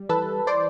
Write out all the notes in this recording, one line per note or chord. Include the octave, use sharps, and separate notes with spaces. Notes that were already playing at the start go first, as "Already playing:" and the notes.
Already playing: G3
E3 A4 B4
C5 D5